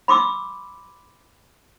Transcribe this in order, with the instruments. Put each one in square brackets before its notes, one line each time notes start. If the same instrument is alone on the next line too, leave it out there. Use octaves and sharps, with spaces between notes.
[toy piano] B5 C6 D6 E6